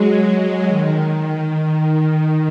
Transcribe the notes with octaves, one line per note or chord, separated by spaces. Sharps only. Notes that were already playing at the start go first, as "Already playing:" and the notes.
Already playing: F#3 G#3
D#3